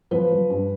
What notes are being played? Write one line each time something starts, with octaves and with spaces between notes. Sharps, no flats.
F3 B4
F3
G2